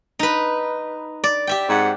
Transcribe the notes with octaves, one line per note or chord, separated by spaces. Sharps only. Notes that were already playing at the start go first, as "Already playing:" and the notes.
D#4 B4
D5
G4 E5 G5
G#2 C4 F#5